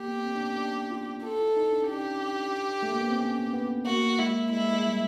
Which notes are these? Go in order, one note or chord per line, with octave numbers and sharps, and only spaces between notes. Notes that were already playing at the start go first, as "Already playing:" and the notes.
Already playing: A#3 G4
B3
C4
D4
C#4
D4
F4
F4 A4
E4
D#4
D4
C#4
D4 G4
A3
A#3
B3
C4
C#4
B3
A#3 F#4
G#3 E4
G#3 E4
G#3
G3